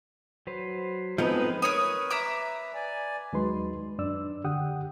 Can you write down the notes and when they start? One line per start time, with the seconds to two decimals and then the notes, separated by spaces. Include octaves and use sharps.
0.47 F#3 B4 C5
1.18 F3 G#3 A3 B3 C4 D#4 B4
1.62 A#4 B4 C#5 D#6
2.10 E5 A#5 D6
2.74 D5 G#5
3.33 D#2 F#3 G#3 D#4 B4 C6
3.98 F#2 D4 D5 E6
4.44 D3 G4 F#5 G5 D#6